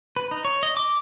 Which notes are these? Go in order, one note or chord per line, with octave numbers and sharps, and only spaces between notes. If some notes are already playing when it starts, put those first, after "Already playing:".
B4
D#4
C#5
D#5
D6